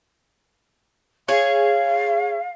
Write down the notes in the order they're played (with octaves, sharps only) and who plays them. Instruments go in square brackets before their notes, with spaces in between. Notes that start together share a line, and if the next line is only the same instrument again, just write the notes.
[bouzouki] G#4 C#5 [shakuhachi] F5